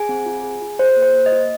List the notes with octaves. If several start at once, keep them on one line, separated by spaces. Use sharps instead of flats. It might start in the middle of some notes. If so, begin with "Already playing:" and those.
Already playing: G#4 G#5
C4
F4
G#4
F4
G#4 C5
A#3
C5
A#3
D#5
F4